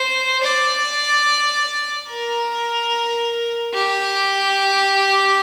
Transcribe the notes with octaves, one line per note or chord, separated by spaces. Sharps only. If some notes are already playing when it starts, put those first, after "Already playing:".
Already playing: C5
D5
A#4
G4